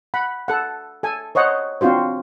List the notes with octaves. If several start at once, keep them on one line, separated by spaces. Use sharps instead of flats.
F#5 B5
A4 F#5
A4 G#5
C5 C#5 D#5 F#5
C4 D4 F4 F#4 C5